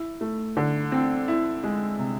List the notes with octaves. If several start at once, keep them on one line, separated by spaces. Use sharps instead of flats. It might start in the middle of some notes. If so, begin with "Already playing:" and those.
Already playing: E4
A3
D3
C4
E4
G#3
C3